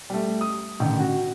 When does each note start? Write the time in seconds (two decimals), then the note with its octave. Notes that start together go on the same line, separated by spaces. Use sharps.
0.10 G3 A3
0.41 D#6
0.80 A1 D3 D#3
0.99 F#4